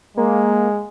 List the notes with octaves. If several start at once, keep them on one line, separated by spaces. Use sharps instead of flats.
G#3 A#3